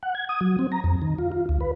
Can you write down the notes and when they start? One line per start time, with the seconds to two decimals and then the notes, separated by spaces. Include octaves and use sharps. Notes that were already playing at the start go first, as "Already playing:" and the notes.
0.03 F#5
0.15 G#6
0.29 D#6
0.41 F#3
0.59 C4
0.72 A#5
0.84 F2
1.02 D#3
1.19 F4
1.32 F4
1.49 D2
1.61 B4